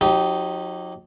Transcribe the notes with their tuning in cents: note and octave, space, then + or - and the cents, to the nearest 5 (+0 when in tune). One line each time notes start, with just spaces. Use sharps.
F#3 -45 D#4 +0 G4 -20